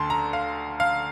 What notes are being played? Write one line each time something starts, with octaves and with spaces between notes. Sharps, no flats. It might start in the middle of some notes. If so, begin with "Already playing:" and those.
Already playing: D2 D3 A5 C6
A#5
F5
F5